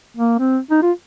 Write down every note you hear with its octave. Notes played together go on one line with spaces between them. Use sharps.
A#3
C4
D#4
F4